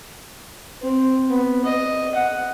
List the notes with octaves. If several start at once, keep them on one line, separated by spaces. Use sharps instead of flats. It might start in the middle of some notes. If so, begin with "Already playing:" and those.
C4
B3
D#5
F#5